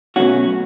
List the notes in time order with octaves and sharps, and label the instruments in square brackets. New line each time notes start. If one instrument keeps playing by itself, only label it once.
[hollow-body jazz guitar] B2 F#3 A3 C#4 F#4